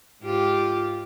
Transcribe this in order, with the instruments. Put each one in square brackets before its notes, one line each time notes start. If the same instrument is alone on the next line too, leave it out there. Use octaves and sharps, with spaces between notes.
[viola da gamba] G#2 F4 G4